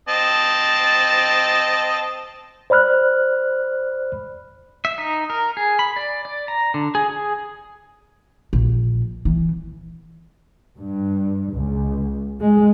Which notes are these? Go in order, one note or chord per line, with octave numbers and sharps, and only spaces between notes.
C4 D#5 A5
C5 D5 B5 F6 F#6
E5
D#4
A#4
G#4
B5
D5
D5
A#5
D3
G#4
G#4
A#1
E3
G2
C#2
G#3